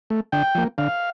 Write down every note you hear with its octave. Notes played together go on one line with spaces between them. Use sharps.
A3
D3 G5
F3 A#3
D3 F5